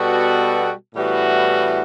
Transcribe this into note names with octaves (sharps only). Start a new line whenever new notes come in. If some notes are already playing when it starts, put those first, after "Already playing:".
Already playing: B2 G3 B3 F#4 A4
A2 E3 G3 B3 F#4